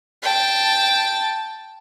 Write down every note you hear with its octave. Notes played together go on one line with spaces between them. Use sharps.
G5 A5